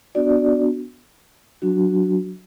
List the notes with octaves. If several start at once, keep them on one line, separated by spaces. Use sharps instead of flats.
B3 D4 F#4 D5
F#3 D4 F#4